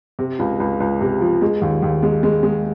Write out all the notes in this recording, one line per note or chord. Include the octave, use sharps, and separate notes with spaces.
C3
C#2
C#2
C#2
C3
F3
G#3
D#2
D#2
G#3
G#3
G#3